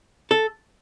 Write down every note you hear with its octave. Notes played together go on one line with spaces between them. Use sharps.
A4